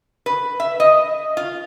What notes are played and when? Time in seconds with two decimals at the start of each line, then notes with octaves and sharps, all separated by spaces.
0.26 B4
0.60 E5
0.80 D#5
1.37 F4